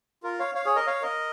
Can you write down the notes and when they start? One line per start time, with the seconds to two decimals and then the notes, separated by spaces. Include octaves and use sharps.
0.23 F4 A#4
0.40 C#5 F5
0.55 C#5 F5
0.65 G#4 C#5
0.76 A#4 D#5
0.87 C#5 F5
1.02 A#4 D#5